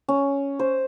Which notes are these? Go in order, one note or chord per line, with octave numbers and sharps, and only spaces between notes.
C#4
C5